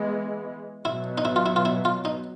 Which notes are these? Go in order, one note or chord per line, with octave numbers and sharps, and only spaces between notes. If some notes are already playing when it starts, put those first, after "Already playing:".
Already playing: E3 G#3 B3
B2 F#3 B3 E4
D#4
E4
F4
E4
F4
E4
F4
D#4